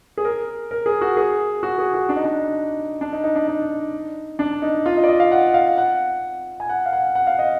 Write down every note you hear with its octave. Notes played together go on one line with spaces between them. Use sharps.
G#4
A#4
A#4
G#4
F#4
G#4
F#4
G#4
F#4
D4
D#4
D4
D4
D#4
D#4
D4
D#4
D4
D#4
F4
D#5
D5
D#5
F5
F#5
F5
F#5
G#5
F#5
F5
F#5
F#5
F5
D#5